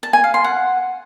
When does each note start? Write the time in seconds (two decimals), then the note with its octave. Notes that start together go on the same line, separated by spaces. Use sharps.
0.03 A5
0.13 G#5
0.24 F5
0.34 C6
0.44 F#5